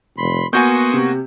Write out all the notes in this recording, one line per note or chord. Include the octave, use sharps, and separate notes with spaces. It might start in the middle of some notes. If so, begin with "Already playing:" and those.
F1 B5 C6
A#3 B3 F#4 G#5 C6 C#6 D#6 G6
C3